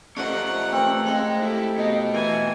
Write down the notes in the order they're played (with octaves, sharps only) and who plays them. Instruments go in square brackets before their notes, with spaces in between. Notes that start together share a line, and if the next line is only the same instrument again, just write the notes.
[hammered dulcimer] F3 A3 [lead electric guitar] C#4 G4 [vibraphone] D5 D#5 [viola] F#5 A#5
[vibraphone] A3 B4 [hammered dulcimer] C4 A#4
[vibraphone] A3 F5 G5 [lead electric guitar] G#4 D#5
[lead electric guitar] E4 [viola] G4 A4
[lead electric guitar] B3 F#4 [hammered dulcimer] D#5
[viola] E3 G#5